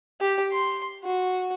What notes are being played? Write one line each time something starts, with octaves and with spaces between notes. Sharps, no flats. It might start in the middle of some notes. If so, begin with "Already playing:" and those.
G4
C6
F#4